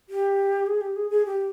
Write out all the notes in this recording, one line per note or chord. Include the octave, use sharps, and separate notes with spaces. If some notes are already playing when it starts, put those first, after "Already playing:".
G4
G#4
G4
G#4
G#4
G4